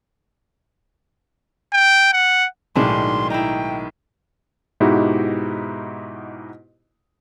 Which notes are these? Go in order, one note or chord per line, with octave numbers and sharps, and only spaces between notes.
G5
F#5
B1 A2 D#3 G#3 D4 C6
D#4 E4 G5
G#2 B2 D#4 E4 F#4 G4